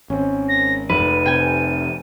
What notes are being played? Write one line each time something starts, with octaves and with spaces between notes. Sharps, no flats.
G#1 C4 C#4
A#6
F1 F2 B4 D#7
C3 G5 G#5